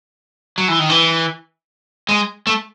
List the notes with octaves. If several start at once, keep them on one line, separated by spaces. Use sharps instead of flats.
F#3
E3
D#3
E3
G#3
A3